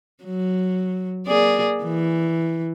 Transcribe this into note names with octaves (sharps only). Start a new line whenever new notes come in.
F#3
A#3 G#4 D5
E3